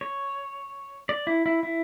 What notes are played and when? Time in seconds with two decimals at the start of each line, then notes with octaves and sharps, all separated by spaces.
0.01 C#5
1.09 D5
1.27 E4
1.46 E4
1.63 E4